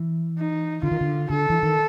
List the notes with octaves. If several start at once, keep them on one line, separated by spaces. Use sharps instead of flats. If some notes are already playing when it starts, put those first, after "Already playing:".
Already playing: E3
D#4
D3 F4
D#3
D3
D3 A4
E3
D#3